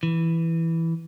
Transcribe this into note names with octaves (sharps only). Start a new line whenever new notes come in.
E3